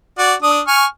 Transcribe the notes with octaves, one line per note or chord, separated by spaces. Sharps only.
F#4 D5
D4 D#6
G#5 C#6 F6